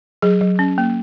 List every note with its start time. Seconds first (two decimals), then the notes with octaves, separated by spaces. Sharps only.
0.22 F#3 G#4
0.41 F#3
0.59 C#4
0.78 A#3